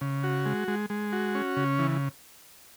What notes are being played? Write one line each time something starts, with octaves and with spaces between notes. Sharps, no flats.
C#3
F#4
G#3
G#3
G#3
F#4
C#4
C#3
E3